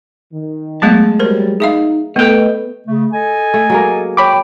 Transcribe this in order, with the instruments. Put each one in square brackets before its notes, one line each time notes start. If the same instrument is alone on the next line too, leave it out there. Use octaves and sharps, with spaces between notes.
[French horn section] D#3
[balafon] F#3 A3 B3 [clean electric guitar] G#3 A5
[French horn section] F#3 G3 [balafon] A#4 C5
[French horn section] D#4 [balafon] G#4 E5 F5
[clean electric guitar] A3 G5 [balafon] B3 A4 [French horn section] B4 D#5
[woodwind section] C#3 A3
A4 D#5 G#5
[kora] A3
F#3 G#3 A#3
[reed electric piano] C#5 B5 D6 [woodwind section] G5